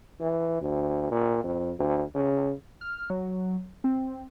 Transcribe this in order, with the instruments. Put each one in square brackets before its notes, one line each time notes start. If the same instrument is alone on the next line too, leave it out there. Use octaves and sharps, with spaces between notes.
[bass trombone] E3
D2
A#2
F2
D2
C#3
[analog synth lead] F6
F#3
C4